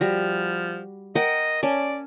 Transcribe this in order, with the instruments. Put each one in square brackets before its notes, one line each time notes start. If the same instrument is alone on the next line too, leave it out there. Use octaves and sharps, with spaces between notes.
[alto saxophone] F3 [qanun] G3 F#4
[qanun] A#4 F#5 G5 [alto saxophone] D#5
[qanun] C#4 A5 [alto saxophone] D5